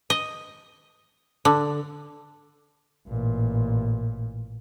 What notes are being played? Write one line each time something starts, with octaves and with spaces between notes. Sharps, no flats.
D#5
D3
A1 A#2